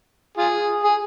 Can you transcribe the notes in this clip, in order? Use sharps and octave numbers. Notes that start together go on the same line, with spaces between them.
F4 G#4
G#4